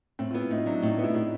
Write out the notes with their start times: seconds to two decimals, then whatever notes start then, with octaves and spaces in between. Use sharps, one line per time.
0.19 A2 C4
0.30 F4
0.34 B3 E4
0.50 A2 D#4
0.66 F#3 D4
0.83 A2 D#4
0.98 B3
1.03 E4
1.14 A2 E4